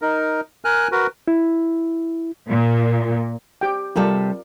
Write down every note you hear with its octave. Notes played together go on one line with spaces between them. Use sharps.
D#4 A#4
A#4 G#5 F6 F#6
F#4 A#4 B4
E4
A#2
G4 G5
C3 G3 F4 A4 A#4 D5